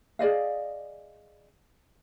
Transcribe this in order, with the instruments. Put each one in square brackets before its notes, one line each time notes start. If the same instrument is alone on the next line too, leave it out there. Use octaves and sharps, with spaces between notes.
[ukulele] G#4 D5 D#5 F5